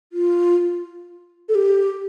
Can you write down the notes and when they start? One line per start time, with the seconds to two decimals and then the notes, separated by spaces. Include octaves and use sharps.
0.13 F4
1.49 A4
1.55 G4